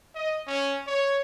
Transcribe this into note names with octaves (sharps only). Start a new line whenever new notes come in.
D#5
C#4
C#5